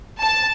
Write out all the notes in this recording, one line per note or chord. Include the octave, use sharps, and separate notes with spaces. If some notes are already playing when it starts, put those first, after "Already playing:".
A5